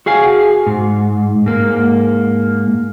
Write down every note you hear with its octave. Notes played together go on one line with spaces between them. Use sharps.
F#4 G#4 F5 G#5
G#2
G#2 A#3